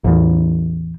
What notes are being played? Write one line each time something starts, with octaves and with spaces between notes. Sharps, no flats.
A1 E2